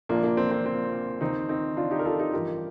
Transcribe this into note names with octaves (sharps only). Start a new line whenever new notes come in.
A#1 A#2 F3 A#3 D4
A#3 D4
C4
C4
C4
D#2 D#3 C4 D#4
C4 D#4
D4 F4
D#4 G4
A#4
F4 A4
D#4 G4
A1 G2 F3 G4 A#4